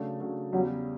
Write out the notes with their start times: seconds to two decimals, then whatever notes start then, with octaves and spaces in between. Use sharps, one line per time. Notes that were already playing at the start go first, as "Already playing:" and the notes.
Already playing: C#3 F#3 A3 D4
0.20 C#3 F#3 A3 D4
0.52 E2 C#3 F#3 G3 C#4